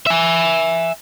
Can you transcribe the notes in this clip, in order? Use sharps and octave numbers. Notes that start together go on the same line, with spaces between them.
E5 G#5